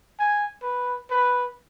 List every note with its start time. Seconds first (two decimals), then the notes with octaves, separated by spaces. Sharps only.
0.19 G#5
0.62 B4
1.10 B4